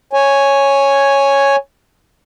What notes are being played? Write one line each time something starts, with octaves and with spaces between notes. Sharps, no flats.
C#5 G#5